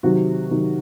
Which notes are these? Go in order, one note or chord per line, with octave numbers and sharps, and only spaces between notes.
C3 D#3 F#3 F#4
C3 D#3 F#3